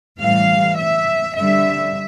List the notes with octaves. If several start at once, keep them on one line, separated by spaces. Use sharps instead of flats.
A2 E3 G3 F5
E5
D3 G3 E5